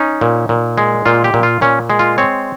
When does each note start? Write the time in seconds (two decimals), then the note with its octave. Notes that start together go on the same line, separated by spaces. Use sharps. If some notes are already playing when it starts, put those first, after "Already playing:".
Already playing: C#4 D#4
0.21 A#2
0.49 A#2
0.78 G#3
1.06 A#2 F4
1.24 G4
1.34 A#2
1.43 F4
1.61 A#2 C#4
1.90 G#3
1.99 F4
2.18 C4 C#5